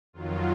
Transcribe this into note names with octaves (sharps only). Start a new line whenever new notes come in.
F2 D#3 F#3 F4